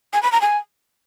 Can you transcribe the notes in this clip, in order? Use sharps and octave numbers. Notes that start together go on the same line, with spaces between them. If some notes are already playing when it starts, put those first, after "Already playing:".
G#5
B5
A#5
G#5